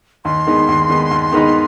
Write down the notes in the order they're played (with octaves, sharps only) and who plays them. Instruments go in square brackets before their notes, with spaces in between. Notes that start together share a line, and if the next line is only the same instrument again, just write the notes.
[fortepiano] D#2 [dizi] C6
[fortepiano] D#3 G#3 B3 D#4
D#2
D#3 G#3 B3 D#4
D#2
D#3 G#3 B3 D#4